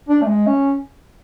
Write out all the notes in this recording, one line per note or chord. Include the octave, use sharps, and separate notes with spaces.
D4
A3
G#3
C#4